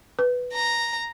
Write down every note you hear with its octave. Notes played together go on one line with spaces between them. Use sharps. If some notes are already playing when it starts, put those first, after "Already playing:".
B4
A#5